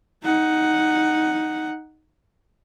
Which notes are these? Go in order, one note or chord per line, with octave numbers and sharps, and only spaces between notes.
D#4 F#5